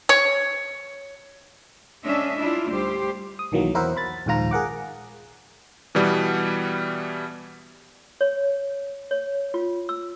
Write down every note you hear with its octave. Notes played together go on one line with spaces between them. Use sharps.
C#5
G#3 C#4 D4 D#5 E5
D4 E4 F4
D2 G3 G4 C5
D#6
B1 D#3 E3 F#3 A#3
E2 E4 A#4 C5 E5 F#5
B5 A6
A#1 D#2 G#2 F3 F4 A#5
G#4 A#4 F#5 D6
B2 E3 G3 B3
C#5
C#5
F4
E6